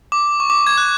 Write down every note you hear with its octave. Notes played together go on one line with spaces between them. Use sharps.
D6
C#6
D6
G#6
F#6